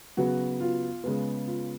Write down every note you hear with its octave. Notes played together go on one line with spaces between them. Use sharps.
C#3 F#3 B3 F#4
F4
C#3 G#3 B3
F4